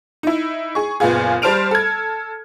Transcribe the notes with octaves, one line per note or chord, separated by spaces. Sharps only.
D#4 E4
G#4 C#6
F#1 A#2 B3 F4 G#4
G3 C5 A5 F6 D7 F7
A4 G#6